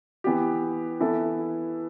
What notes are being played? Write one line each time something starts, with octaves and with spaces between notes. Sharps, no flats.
E3 B3 G4
E3 B3 E4 A4